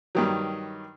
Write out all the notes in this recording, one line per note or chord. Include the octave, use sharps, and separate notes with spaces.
G2 D#3 F#3